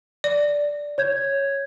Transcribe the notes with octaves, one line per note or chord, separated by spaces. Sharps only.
D5
C#5 G6 G#6